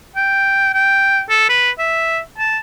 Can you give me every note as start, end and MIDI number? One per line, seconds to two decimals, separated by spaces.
0.16 0.73 79
0.73 1.22 79
1.30 1.48 69
1.49 1.71 71
1.79 2.20 76
2.38 2.59 81